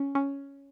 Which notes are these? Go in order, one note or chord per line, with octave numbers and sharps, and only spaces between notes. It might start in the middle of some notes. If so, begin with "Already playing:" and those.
Already playing: C#4
C#4